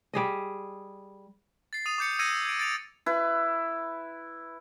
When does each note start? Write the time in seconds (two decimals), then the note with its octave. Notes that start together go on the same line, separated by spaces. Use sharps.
0.13 G3 G#4 D#5
1.73 A6 C7
1.86 D#6 D#7 F7
1.98 D6 G6 C#7
2.19 E6 G#6 A#6 C#7 D#7
2.46 G#6 D7
2.59 A6 D7 F7
3.06 E4 B4